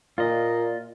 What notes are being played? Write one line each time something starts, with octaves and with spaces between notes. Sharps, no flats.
A#2 F4 D#5